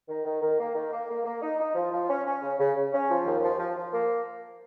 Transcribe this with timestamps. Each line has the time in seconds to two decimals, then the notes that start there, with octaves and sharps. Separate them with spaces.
0.09 D#3
0.25 D#3
0.41 D#3
0.59 A#3
0.75 D#3
0.92 A#3
1.09 A#3
1.25 A#3
1.42 D#4
1.59 D#4
1.75 F3
1.92 F3
2.09 C#4
2.25 C#4
2.42 C#3
2.59 C#3
2.76 C#3
2.92 C#4
3.10 F3
3.26 D#2
3.42 F3
3.59 F3
3.76 F3
3.93 A#3